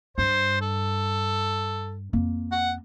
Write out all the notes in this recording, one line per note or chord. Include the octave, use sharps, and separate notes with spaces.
G2 C5
A4
F2 A#3
F#5